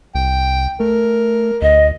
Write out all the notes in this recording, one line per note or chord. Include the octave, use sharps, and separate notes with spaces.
C2 G5
A3 A#4
D2 D#5